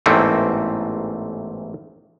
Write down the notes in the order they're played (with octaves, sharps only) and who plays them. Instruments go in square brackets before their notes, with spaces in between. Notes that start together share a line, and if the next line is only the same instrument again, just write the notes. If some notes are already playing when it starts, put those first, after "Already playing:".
[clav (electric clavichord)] A1 E2 G#2 A3 A#3 C4